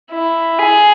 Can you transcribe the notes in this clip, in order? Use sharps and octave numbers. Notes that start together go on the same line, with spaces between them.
E4
G#4